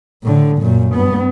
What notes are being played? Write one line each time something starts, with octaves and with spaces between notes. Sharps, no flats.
A2 D3
F#2 A#2
G2 B3